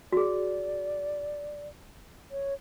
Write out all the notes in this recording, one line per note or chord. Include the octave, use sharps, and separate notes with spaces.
F#4 G#4 D5
C#5